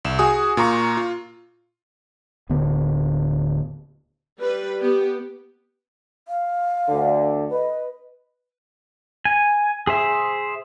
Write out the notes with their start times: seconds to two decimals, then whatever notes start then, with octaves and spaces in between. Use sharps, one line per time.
0.05 C2 E7
0.19 F#4 G#4 G#5 D#6
0.57 A#2 F4 A#5 C#6
0.97 F4
2.49 D1 D3 B3
4.41 G3 B4
4.81 B3 G4
6.28 F5
6.89 D2 D3
7.51 B4 D#5
9.25 G#5
9.87 G#4 C5 E5